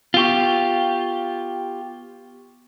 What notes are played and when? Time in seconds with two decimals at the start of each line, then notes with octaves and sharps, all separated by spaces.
0.14 B3 F4 G4 C#6